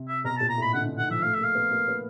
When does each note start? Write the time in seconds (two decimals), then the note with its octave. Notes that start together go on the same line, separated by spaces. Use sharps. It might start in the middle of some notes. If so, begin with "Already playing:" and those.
Already playing: C3
0.08 E5
0.24 B2 A#5
0.38 A#2 A5
0.49 A#5
0.58 A2 B5
0.74 D3 F#5
0.86 D3
0.98 D#3 F#5
1.09 F3 E5
1.22 A3 F5
1.34 A#3 E5
1.44 F5
1.55 B3
1.71 A#3
1.88 B3